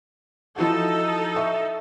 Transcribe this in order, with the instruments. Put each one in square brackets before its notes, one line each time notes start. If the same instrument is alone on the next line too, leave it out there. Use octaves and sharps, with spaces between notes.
[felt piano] F3 E4 F#4 [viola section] D#4 A4
[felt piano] E5 C#6